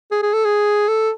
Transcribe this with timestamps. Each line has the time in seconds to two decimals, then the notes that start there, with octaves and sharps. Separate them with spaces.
0.11 G#4
0.22 G#4
0.33 A4
0.45 G#4
0.88 A4